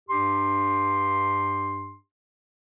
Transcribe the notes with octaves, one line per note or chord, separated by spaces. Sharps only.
G2 D4 G4 C6